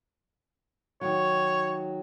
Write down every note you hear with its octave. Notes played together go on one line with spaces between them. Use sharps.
D#3 F#3 C#5